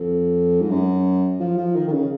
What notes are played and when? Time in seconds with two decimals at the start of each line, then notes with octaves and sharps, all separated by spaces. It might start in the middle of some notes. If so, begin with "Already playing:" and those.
Already playing: F2
0.61 G#2
0.70 F#2
1.40 F3
1.57 F3
1.75 D#3
1.88 D#3
1.92 C#3